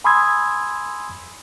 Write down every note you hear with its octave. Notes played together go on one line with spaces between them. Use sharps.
G#5 B5 C6 D#6 E6 G#6